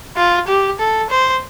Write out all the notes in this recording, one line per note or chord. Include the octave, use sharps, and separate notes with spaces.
F4
G4
A4
C5